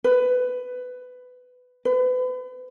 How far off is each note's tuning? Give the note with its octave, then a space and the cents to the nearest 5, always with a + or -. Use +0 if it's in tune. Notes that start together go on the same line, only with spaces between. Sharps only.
B4 +15
B4 +35